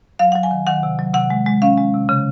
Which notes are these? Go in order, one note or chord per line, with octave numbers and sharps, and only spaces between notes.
F#3 F5
F#3 F#5
G#5
D#3
D#3 F#5
C3
F#3
C3 F#5
G#3
G#3
C#4 F5
G#3
C3
C#3